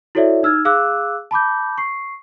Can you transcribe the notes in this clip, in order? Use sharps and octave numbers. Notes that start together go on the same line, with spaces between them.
E4 F#4 A4 C#5 D5 E5
D#4 E6 F6 G#6
G#4 F5 D6 E6 F#6
A5 B5 D6 G6
C#6 C7